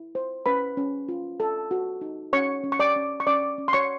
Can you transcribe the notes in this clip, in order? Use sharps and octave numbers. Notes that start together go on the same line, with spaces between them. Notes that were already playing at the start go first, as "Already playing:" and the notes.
Already playing: E4
C5
C#4 B4 B5
C#4
F4
A4
F#4
D#4
C#4 C#5 C#6
C#4
C#6
D5 D6
C#4
C#6
C#4 D5 D6
C#4
C6
C#5 C#6